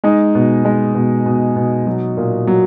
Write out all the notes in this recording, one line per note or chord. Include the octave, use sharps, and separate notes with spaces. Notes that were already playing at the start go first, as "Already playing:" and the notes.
G#3 D#4
B2
G#3
B2
B2
B2
F#3
A#2
F#3